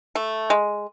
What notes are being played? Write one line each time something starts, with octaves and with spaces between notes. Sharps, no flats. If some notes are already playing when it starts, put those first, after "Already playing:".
A3
G#3